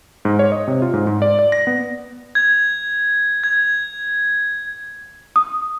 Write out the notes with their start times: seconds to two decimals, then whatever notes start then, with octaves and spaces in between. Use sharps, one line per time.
0.25 G#2
0.39 C#5
0.52 D#5
0.68 C3
0.82 F4
0.93 G#2
1.07 G#2
1.22 D5
1.39 D5
1.52 A#6
1.67 B3
2.35 G#6
3.44 G#6
5.36 D#6